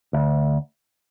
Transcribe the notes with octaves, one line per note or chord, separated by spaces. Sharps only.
D2